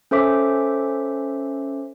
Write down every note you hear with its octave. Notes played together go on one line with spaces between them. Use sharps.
C#4 A4 C5 E5 D6 B6